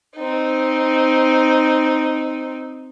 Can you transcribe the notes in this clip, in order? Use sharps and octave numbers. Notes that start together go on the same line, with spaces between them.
C4 D#4